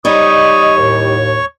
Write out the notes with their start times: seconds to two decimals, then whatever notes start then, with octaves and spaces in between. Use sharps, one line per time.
0.05 G3 D#4 C#5 D#5 C#6 D#6
0.77 D#2 A2